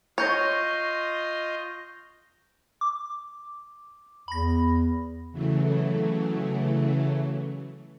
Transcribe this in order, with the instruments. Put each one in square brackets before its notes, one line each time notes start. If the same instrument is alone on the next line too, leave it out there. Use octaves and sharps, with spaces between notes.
[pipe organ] F4 D#5 C6 [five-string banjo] C#5 [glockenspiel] C#6 G6 A#6
[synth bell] D6
[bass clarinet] E2 [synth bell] B5 A#6
[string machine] C#3 E3 F#3 A3